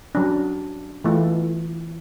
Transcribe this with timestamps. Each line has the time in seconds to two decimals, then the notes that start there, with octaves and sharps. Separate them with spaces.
0.15 F#3 C#4 D4
1.04 E3 A3 F4